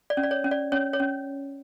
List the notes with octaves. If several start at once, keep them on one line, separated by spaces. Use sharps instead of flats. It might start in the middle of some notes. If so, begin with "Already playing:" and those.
D5
C#4
D5
C#5
C#4
D5
C#4 C#5
C#5
C#4